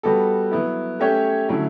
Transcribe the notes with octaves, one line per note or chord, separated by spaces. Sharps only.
G3 B3 F#4 A4
F#3 B3 E4
A3 C#4 G4 C#5 E5
D3 F#3 A3 C#4 E4